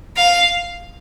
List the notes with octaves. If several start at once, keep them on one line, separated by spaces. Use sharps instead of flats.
F5